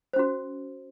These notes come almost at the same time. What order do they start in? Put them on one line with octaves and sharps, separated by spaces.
C5 C#4 F#4